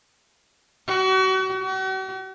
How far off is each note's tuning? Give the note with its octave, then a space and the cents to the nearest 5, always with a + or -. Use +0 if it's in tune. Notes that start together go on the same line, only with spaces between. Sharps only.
F#4 +35
F#4 +45